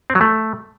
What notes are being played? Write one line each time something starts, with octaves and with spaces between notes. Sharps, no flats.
C4
F#3
A3